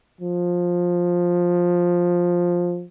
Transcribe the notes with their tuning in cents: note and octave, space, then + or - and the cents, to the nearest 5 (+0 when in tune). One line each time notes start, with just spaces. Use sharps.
F3 +10